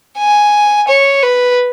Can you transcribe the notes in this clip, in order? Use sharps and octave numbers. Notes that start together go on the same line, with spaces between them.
G#5
C#5
B4